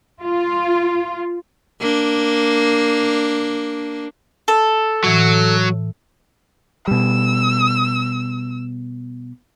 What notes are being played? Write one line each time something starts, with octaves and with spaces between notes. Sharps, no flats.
F4
A#3 D4
A4
A2 E3 F#3
B2 G3 E6